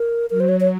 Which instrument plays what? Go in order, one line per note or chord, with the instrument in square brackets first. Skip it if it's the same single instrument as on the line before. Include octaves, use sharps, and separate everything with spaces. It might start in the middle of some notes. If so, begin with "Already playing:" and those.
Already playing: [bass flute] A#4
[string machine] F#3 [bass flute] A#4
[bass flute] C5
C#5
C#5